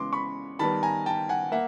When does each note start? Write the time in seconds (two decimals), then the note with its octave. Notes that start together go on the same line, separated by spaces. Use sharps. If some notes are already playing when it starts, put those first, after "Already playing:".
Already playing: C#3 E3 G#3 B3 C6 D6
0.13 B5 C#6
0.59 D#3 G3 B3 A5 B5
0.83 G#5 A#5
1.06 G5 A5
1.29 F#5 G#5
1.52 A#3 E5 F#5